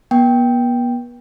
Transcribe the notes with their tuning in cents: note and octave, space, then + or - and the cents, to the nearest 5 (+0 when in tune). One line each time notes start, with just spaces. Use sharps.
B3 -40 G5 +0